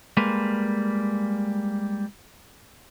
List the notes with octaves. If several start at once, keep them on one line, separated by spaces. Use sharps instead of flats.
G3 G#3 A#3 B4